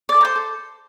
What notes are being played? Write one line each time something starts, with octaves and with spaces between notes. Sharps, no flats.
D5 D6
A4
A#5
C5 C6
A4